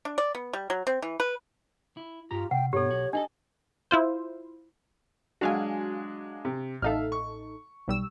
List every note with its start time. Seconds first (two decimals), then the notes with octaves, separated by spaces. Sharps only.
0.05 D4
0.18 D5
0.35 B3
0.53 G3
0.70 F#3
0.87 C4
1.02 E3
1.20 B4
1.97 E4
2.31 G2 F4 G4 A#5
2.51 C3 F#5 G5
2.73 G2 B2 G4 A4 C#5
2.89 B1 F#4
3.13 D4 D#4 G#4 A4 D#5
3.91 E4 F4 C5
5.41 F#3 G#3 D4 F#4 F5 G#5
6.45 C3
6.82 A1 D#4 A4 E5 F5 F6
7.12 C#6
7.88 B1 G3 E6